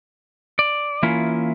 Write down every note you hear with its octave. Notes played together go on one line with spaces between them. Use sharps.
D5
E3 A#3 C#4 E4 F4